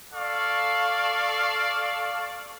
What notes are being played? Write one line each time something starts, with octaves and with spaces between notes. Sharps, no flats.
A4 D5 F5 C#6